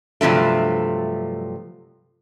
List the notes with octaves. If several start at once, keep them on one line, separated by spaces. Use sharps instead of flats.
G2 C3 F3 F#3 A3